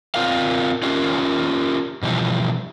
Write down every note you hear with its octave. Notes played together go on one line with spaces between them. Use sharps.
B3 C4 F4 A#4 F5
C#4 F4 G4 A#4
B2 E3 F3 G3